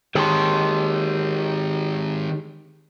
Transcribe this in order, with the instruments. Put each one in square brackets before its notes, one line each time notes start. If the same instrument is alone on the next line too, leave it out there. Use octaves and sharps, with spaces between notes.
[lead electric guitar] D#3 G#3 [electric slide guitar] G4 C#5 G5 [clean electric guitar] G#4 A5 C6